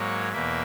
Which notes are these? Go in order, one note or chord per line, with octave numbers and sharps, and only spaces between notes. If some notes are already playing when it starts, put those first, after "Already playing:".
Already playing: G#2 F#3 A#3 C#5
E2 B2 A#3 E5